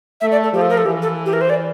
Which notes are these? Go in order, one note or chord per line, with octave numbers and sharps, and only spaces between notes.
A3 E5
D5
A4
F3 G4
A4
A#4
A4
E3 G4
A4
G4
A#4
C5
D5